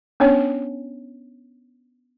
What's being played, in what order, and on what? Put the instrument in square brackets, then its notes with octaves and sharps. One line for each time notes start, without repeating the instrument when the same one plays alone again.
[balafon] B3 C#4 D4 C#5